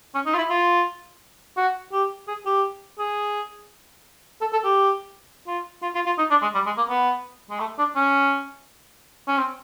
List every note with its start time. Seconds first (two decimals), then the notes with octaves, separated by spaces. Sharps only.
0.15 C#4
0.26 D#4
0.34 F4
0.38 E4
0.50 F4
1.57 F#4
1.92 G4
2.28 G#4
2.46 G4
2.99 G#4
4.41 A4
4.53 A4
4.65 G4
5.47 F4
5.82 F4
5.95 F4
6.06 F4
6.18 D#4
6.31 D4
6.42 G#3
6.54 G3
6.66 G#3
6.77 A#3
6.89 B3
7.50 G#3
7.60 A3
7.78 D4
7.96 C#4
9.28 C#4
9.38 C4